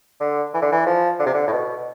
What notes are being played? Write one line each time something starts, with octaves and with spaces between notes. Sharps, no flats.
D3
E3
D3
E3
F3
D3
C3
D3
A2
B2